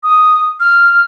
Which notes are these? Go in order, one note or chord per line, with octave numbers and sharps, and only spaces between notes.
D#6
F6